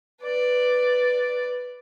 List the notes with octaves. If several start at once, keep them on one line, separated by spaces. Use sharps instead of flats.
B4 D5